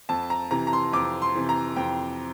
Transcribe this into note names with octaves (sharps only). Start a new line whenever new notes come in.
F2 A5
A#5
C3 E3 A#5
A#5
C6
F2 D6
C6
C3 E3
A#5
F2 G5